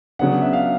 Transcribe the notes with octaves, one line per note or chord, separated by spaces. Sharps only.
C#3 F#3 B3 D4 F#5
E5
F5